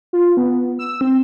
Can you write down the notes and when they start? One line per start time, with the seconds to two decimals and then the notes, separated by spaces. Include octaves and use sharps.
0.13 F4
0.37 B3
0.79 E6
1.01 C4